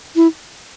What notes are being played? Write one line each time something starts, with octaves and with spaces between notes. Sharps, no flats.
E4